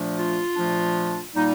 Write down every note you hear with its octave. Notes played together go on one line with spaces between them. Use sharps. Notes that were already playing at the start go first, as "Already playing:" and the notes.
Already playing: A#2 F3 A3 D4
F4
A#2 F3 A3 D4
A#2 G3 A#3 D#4